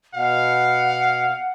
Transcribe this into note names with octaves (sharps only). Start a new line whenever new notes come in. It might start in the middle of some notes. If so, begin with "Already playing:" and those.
B2 F5 F#5